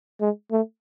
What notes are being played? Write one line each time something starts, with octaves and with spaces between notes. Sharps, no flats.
G#3
A3